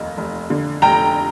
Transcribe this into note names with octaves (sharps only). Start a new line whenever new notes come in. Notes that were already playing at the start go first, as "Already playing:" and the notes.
Already playing: F1 D#2 D#5
F1
D3
F1 G5 A#5